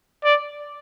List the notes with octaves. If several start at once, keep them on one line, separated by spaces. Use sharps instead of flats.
D5